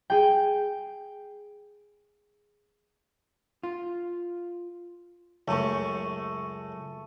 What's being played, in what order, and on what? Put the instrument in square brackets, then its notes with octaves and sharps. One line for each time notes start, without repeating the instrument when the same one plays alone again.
[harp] G#4 G5
[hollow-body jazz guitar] F4
[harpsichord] C#2 F#2 C#4 [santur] A3 C#6